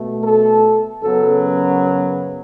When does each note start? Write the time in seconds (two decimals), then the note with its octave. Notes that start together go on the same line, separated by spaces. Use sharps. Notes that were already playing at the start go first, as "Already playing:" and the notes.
Already playing: B2 A3
0.22 A4
1.02 F#2 C#3 F#3 B3 A4